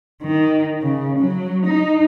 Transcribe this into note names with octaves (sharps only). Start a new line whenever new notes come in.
D#3
C#3
F#3
D#4